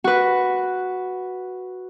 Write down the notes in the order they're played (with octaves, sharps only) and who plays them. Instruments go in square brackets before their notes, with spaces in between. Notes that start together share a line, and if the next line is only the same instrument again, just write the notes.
[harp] F#4 B4